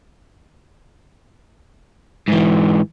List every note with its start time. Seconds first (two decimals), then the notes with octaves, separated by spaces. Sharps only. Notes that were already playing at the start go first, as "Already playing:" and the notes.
2.28 G#2 E3